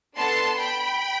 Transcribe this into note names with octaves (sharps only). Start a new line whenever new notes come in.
B3 D4 A4 A5 C6
G5 B5